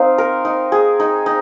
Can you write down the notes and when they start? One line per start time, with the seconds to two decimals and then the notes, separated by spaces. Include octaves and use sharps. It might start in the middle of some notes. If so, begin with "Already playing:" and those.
Already playing: C4 D#4 F5
0.18 A#4
0.45 D#4
0.72 G#4
1.00 D#4
1.26 D#4